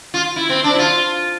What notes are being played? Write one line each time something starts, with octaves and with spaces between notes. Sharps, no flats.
F4
E4
C4
D4
E4
F4